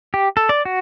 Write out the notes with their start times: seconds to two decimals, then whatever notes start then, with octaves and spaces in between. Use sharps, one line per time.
0.14 G4
0.37 A4
0.49 D5
0.65 F#4